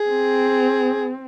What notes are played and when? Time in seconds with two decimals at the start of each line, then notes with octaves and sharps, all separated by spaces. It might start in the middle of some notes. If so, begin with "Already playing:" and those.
Already playing: G#4
0.09 C4